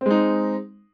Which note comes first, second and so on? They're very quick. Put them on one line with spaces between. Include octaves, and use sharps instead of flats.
C4 G#3 D#4